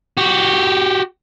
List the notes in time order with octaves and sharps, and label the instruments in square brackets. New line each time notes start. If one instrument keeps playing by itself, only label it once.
[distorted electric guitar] F#4 G4